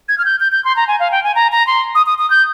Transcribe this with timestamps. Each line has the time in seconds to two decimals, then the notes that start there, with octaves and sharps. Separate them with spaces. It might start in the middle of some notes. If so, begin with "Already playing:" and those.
0.09 G#6
0.18 F6
0.25 G6
0.40 G6
0.52 G6
0.65 C6
0.76 A#5
0.88 G#5
1.00 F5
1.12 G5
1.24 G#5
1.35 A#5
1.52 A#5
1.67 C6
1.95 D#6
2.06 D#6
2.19 D#6
2.30 G6